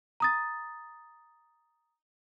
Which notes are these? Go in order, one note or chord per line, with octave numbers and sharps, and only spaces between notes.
A#5 D#6 A6